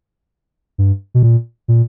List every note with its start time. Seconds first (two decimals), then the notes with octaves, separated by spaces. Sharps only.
0.78 G2
1.14 B2
1.23 A#2
1.68 A#2